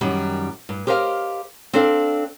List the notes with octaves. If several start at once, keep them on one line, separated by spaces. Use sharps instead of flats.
F#2 D#3 G3
G2
G4 A#4 C5 D#5 F5
C4 D4 A4 D5 F5